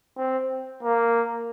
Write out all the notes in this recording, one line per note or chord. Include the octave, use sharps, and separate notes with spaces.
C4
A#3